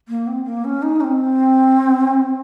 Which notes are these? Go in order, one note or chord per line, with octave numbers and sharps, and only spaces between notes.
A#3
C4
A#3
C#4
D#4
C#4
C4